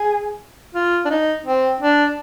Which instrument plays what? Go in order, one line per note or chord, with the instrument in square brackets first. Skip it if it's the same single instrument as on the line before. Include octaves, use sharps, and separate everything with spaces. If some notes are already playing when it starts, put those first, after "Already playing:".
Already playing: [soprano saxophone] G#4
F4
D4
D#4
C4
D4